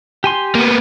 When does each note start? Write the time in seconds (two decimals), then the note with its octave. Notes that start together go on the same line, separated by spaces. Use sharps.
0.24 G4 G#5 C6
0.55 A#3 B3